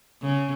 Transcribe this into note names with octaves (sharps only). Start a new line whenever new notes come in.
C#3